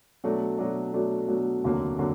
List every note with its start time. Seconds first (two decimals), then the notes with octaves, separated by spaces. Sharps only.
0.24 B2 F#3 A3 D4
0.58 B2 F#3 A3 D4
0.93 B2 F#3 A3 D4
1.28 B2 F#3 A3 D4
1.64 F1 D#2 D3 F#3 A#3
1.99 D3 F#3 A#3